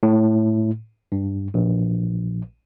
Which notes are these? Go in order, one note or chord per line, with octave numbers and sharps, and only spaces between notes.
A2
G2
A#1